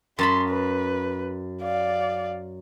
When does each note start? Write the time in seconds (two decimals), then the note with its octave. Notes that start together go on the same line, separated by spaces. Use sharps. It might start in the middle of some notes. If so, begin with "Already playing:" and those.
0.19 F#2 A5 B5 C6
0.50 B4
1.63 D5 F5